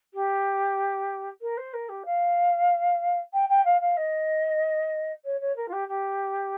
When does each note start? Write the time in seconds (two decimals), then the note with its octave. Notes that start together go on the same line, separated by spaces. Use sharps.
0.14 G4
1.41 A#4
1.57 C5
1.73 A#4
1.89 G4
2.05 F5
3.33 G5
3.49 G5
3.65 F5
3.81 F5
3.97 D#5
5.24 C#5
5.40 C#5
5.56 A#4
5.68 F4
5.72 G4
5.88 G4